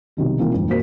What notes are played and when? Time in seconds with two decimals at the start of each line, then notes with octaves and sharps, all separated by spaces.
0.17 B1 C3 D#3 G3
0.38 B2 E3 A#3 C4 D#4 F4
0.54 D#1 F2 G#2
0.68 A#2 A#3 F#4 A#4 C5 B6